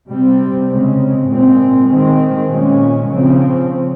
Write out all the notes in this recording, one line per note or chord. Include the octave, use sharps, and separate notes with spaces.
C3 G3 C4
C#3 G#3 C4
A#2 G#3 C4
D#3 G#3 C4
A#2 G#3 C#4
C#3 F3 C4